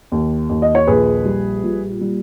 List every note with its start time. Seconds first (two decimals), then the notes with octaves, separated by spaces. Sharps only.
0.12 D#2
0.49 D#2
0.62 D#5
0.75 C#5
0.87 A#1 G#4 B4
1.25 G3
1.63 A#2
2.01 G3